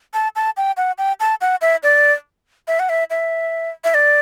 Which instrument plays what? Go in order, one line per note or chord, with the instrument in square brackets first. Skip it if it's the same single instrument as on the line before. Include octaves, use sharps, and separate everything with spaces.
[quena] A5
A5
G5
F#5
G5
A5
F#5
E5
D5
E5
F#5
E5
E5
E5
D5